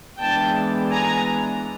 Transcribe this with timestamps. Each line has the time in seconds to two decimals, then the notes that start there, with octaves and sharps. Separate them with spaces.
0.21 E3 G#3 B3 D4 G5 A5
0.92 G#5 A#5